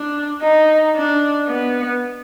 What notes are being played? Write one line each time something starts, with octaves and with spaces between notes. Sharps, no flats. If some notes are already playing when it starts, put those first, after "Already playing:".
Already playing: D4
D#4
D4
B3